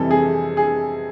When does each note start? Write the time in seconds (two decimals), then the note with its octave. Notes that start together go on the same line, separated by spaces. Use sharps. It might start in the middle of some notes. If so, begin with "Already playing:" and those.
Already playing: F2 C3 E3 G3 A4
0.11 G#4
0.57 G#4